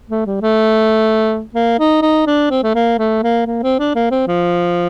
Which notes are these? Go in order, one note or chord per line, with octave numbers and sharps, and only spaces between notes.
A3
G3
A3
A#3
D#4
D#4
D4
C4
A3
A#3
A3
A#3
A#3
C4
D4
A#3
C4
F3